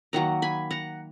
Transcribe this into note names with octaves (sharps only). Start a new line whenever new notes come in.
D#3 F#3 A#3 F#5 A#5
G#5 B5
F#5 A#5